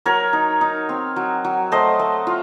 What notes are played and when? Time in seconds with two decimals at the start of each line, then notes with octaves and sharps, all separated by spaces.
0.05 F#3 A#4 C#5
0.33 D#4
0.61 D#4
0.89 C4
1.16 F#3
1.45 F#3
1.72 A3 C5 D#5
1.99 A3
2.27 F4